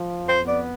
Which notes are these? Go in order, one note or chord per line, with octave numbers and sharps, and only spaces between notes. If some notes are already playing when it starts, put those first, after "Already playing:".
Already playing: F3
F2
C5
B3
D5